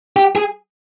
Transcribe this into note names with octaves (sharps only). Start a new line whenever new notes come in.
G4
G#4